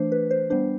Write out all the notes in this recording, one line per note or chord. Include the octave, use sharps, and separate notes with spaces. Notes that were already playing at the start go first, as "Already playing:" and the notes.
Already playing: E3 A3 D4 C5
B4
C5
G3 B3 D4 C5